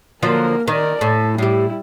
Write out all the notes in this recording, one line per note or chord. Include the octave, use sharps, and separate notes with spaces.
D3 F3 F#3 A#3 A#4
D#3 A#4 D5
A2 A4
A2 G3 E4 G4